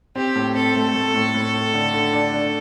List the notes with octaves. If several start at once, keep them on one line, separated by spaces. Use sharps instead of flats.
C4 G4
A2
C4 A4
A3
A3
A2
A2
A2
D3
D3
D4
D4